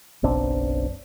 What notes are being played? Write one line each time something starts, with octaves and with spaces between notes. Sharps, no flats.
F#1 B1 C4 D4